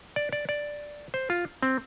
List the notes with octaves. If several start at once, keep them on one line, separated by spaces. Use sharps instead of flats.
D5
D5
D5
C5
F4
C4